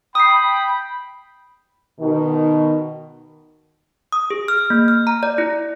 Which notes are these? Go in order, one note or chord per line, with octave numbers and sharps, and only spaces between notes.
G5 B5 D#6 C7
B2 D#3
D#6
G#4
F6
A#3
F6
A#5
D5
E4